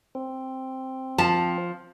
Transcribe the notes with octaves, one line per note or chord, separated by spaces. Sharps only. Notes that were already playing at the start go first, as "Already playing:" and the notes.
C4
F3 A5